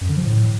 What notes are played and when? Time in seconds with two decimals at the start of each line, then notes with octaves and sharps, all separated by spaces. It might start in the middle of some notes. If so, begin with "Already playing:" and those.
0.01 F#2
0.09 D3
0.17 F3
0.25 A2